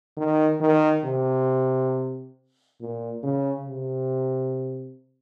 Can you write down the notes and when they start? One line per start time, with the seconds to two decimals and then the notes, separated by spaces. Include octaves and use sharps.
0.17 D#3
0.61 D#3
1.05 C3
2.81 A#2
3.23 C#3
3.68 C3